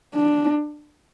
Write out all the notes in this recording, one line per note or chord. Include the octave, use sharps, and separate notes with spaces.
D4